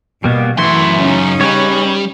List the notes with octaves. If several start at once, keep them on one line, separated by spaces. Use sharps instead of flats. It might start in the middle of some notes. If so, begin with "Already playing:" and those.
B2 G3 A#3 B3
F#2 E3 A3 E4 F#4 C6
C#3 C#4 D#4
G3 B4 C#5